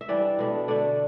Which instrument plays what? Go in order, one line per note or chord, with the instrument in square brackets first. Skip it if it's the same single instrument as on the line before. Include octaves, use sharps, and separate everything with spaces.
[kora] E5
E3 G3 D4 D5
B2 A3 D4
D3 A3 D4 D5